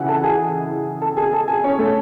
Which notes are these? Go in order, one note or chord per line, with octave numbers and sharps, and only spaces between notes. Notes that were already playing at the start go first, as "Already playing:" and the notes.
Already playing: C#3 E3 E4 F#4 E5 F#5 G#5
A4 A5
G#4 G#5
A4 A5
G#4 G#5
A4 A5
G#4 G#5
C#4 C#5
A3 A4